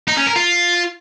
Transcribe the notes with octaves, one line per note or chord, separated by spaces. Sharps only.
D#4
C#4
A#4
F4